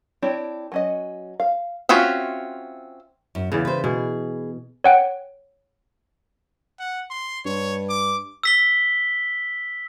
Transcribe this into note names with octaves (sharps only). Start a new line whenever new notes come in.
C4 D4 E4 G4 C#5
F#3 C#4 D#5
F5
C4 C#4 F4 F#4 E5
F#2
E2 C#3 E3 D5
B4 C5
B2 G#4
C#5 F#5 G5
F#5
C6
G2 C#5
D6
E6 B6 G7